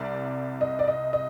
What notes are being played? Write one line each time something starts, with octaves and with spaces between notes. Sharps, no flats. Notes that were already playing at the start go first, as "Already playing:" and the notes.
Already playing: C2 C3 D5
D#5
D5
D#5
D#5